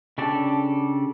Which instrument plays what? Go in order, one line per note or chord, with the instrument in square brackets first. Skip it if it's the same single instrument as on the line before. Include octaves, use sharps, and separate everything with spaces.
[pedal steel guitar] C#3 D4 G4 A4 D5